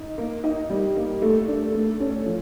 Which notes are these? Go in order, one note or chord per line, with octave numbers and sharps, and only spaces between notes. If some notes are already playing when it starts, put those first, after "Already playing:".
Already playing: D#4
A#3
D#4
G3
A#3
A3
D4
A3
C#4
F3